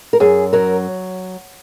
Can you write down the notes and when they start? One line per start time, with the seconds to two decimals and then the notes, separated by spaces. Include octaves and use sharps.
0.13 A#4
0.20 F#2 G#4
0.53 F#3 A#4